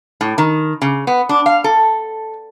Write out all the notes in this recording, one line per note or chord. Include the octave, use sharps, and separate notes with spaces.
A2
D#3
C#3
B3
D4
F5
A4